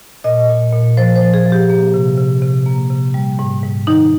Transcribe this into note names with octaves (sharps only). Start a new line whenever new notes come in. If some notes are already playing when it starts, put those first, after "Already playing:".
A#2 D#5
A#2
A#2
F3 C5
C5
F3
G#4
F3
G4
A#3
C3
C3
C3
A#3
C3
G3
G#2
G#2
D#3 D#4